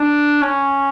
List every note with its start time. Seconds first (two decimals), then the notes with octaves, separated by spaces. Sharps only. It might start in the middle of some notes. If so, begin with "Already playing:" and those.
Already playing: D4
0.42 C#4